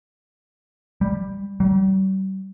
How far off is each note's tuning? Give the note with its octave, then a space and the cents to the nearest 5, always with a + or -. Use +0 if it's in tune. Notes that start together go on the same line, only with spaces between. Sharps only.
G3 +10
G3 -40